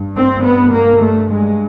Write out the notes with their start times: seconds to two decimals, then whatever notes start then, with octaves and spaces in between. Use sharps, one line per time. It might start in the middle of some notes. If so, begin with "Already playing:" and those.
Already playing: G2
0.16 C4
0.44 B3
0.72 A#3
1.01 A3
1.29 G#3